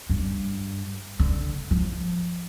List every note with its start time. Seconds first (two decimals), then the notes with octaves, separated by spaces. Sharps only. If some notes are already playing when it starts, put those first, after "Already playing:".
0.10 G2
1.19 D3
1.71 F3